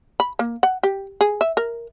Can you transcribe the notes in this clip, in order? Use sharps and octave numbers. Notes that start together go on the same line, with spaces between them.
B5
A#3
F#5
G4
G#4
E5
A#4